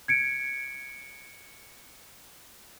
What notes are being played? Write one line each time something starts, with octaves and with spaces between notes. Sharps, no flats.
G#6 C#7 D7